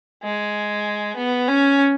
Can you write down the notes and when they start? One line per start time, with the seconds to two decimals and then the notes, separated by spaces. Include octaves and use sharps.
0.23 G#3
1.16 B3
1.48 C#4